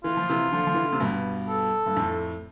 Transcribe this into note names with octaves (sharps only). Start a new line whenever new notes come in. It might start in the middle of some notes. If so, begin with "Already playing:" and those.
E3 F4
F3
C3 E3
D3 F3
F3
E3
D3
C3
G2 B2
A4
G2
F2 A2